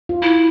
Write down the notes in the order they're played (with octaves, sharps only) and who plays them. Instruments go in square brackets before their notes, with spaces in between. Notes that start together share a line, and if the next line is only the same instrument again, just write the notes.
[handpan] F4
[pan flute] E4